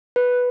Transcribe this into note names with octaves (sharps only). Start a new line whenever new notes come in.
B4